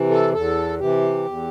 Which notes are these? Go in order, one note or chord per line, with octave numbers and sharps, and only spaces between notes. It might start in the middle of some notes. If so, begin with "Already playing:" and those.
Already playing: C3 E3
A4
E2 A4
C3 E3 G4
E2